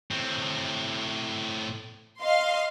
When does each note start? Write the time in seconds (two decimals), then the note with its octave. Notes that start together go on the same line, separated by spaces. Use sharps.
0.11 A2 C4
2.21 D#5 F5 C6